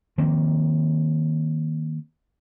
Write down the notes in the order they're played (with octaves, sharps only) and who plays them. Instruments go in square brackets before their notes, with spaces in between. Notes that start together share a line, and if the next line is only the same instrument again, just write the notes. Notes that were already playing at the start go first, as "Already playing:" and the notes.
[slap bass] D#3 F3 A#3 C4